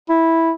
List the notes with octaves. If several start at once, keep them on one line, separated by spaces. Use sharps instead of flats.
E4